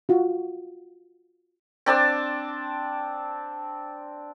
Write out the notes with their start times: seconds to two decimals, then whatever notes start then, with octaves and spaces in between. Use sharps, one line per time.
0.09 F4 F#4
1.86 C4 D4 A5 D6